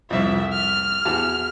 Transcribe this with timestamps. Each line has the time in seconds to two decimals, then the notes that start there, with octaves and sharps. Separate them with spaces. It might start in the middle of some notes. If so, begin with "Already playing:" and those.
0.10 C2 F2 E5
0.53 F6
1.05 E2 F#4 A5